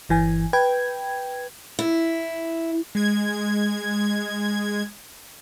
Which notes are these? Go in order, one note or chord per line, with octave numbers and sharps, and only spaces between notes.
G1 E3 G#5
B4 G5 G#6
E4
G#3 G#6